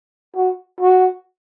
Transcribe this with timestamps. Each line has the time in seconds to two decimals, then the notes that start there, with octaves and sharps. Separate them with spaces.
0.36 F#4
0.81 F#4